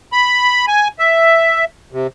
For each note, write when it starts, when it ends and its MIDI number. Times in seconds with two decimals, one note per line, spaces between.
0.13 0.66 83
0.68 0.88 80
0.99 1.65 76
1.92 2.07 48